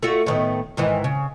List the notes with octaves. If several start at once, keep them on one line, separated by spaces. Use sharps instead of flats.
A3 F4 F#4
A2 D#3 B3
G#2 D#3 E3
C#3